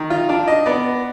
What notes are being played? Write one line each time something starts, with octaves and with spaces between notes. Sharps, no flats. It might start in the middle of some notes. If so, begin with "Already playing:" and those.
Already playing: D#3
F4
D4 D5
D#5
B3 D5